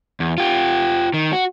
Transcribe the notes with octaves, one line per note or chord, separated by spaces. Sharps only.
E2
F4 G4
D#3
F#4